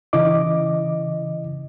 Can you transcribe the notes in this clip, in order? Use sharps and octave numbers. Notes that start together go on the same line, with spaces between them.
C#3 E3 E4 D#5 D6